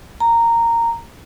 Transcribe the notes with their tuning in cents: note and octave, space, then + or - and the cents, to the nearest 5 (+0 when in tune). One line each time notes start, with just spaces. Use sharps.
A#5 -10